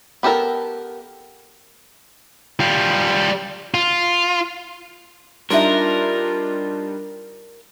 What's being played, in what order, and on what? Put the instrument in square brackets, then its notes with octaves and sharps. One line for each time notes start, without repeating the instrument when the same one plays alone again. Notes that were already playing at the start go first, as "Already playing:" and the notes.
[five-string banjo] B3 G4 A4 A#4
[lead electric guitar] G3 F4
F4
[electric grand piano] G3 D4 D#4 [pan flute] F4 [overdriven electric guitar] A#4 [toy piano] E5 C6